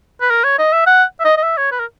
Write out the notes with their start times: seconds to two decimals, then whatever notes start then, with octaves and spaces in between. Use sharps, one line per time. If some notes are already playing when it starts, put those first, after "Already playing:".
0.21 B4
0.30 A#4
0.44 C#5
0.59 D#5
0.73 E5
0.87 F#5
1.20 E5
1.25 D#5
1.37 D#5
1.43 E5
1.57 C#5
1.72 B4
1.80 A#4